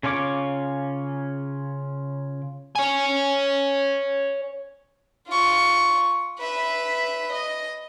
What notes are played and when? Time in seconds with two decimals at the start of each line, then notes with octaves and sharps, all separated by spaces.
0.03 C#3 C#4 F4 C#5 D6
2.75 C#5 G#5
5.28 F4 C#6
6.40 B4 E5
7.33 D#5